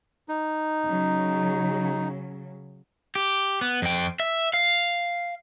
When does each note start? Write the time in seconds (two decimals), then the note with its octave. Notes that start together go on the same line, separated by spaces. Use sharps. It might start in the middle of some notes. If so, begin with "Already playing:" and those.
0.29 D#4
0.85 C#3 F#3
3.15 G4
3.61 B3
3.82 F2 G5
4.20 E5
4.54 F5